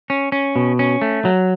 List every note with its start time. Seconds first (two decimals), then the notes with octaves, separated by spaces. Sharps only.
0.10 C#4
0.32 C#4
0.56 B2
0.79 C#4
1.02 A3
1.25 F#3